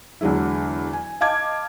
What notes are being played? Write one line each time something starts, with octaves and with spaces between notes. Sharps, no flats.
E2 D3 F#3 G#3 E4
G#5
D#5 F5 A5 D6 G#6